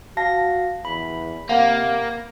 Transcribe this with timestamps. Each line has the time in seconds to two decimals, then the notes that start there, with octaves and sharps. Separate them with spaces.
0.17 F#4 F5 A5 A#6
0.85 E2 B5
1.49 C3 A#3 F5 F#5 A#5